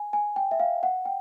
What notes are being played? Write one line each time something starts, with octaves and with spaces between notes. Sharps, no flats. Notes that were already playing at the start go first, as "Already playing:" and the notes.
Already playing: G#5
G#5
G5
E5
F5
F#5
G5